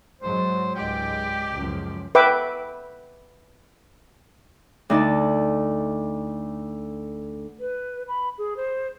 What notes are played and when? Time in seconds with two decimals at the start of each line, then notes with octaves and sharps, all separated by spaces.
0.21 G#2 F#3 G#3 C5
0.75 C#2 G#2 G#3 G4 D5 G5
1.55 C#2 F#2 F3
2.15 B4 E5 G5 D6
4.90 D2 D#4 D5 A5
7.60 B4
8.08 B5
8.38 G#4
8.57 C5